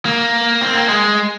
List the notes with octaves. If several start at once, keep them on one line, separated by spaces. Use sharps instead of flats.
A#3
C4
A#3
G#3